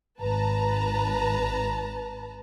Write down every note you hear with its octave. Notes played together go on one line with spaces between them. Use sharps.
G#1 B4 A5 A#5